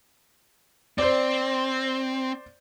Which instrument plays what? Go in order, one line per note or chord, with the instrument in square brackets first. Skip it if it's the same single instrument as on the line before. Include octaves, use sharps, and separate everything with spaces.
[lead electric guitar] C4 [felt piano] C5 D5